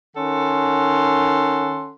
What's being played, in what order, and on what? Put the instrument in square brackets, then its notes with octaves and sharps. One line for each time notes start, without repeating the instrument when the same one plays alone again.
[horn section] D#3 C#4 A4 F#5 C6